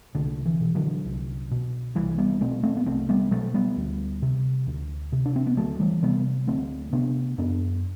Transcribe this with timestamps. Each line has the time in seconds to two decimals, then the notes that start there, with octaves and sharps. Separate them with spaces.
0.15 C2 D3
0.46 E3
0.61 B2
0.75 D3 F#3
1.05 C2
1.51 B2
1.95 C2 E3 G3
2.18 G3 B3
2.41 B2 A3 C4
2.63 A3 C4
2.77 B3
2.86 C2 A3 C4
3.09 G3 B3
3.31 B2 F#3 A3
3.54 G3 B3
3.77 D2
4.22 C3
4.67 D2
5.12 C3
5.26 D4
5.36 C4
5.47 B3
5.57 D2 F#3 A3
5.80 E3 G3
6.03 C3 G3 B3
6.47 D2 A3 C4
6.93 C3 B3 D4
7.38 F#2 B3 D4